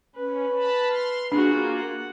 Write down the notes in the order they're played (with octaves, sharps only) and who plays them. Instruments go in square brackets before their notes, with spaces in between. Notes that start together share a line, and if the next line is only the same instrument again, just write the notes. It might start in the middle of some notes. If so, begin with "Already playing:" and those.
[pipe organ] C#4 [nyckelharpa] B4
[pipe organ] A5 B5
C6 F6
[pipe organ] A#3 F4 [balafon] D4 [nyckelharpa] F#4 G#4
[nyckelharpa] F#5